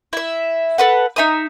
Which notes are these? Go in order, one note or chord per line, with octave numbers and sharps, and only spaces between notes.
E4 E5
A4 B4 F#5
D#4 E5 A#5 D#6